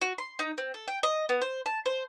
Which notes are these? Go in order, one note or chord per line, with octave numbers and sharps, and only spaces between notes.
F#4
C6
D#4
C4
A4
G5
D#5
B3
C5
A5
C5